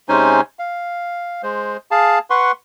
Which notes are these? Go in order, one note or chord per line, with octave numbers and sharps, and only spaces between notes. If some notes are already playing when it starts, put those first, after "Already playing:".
C3 G#3 C#4 D#4 C5 G#5
F5
G#3 C5
G#4 F5 A5
B4 F#5 C6 C#6